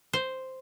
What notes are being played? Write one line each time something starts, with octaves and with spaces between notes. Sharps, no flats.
C5